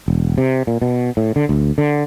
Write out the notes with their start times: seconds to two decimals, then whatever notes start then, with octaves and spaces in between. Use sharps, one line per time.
0.08 E1
0.38 C3
0.67 A#2
0.82 B2
1.17 A2
1.36 D3
1.49 D2
1.78 D3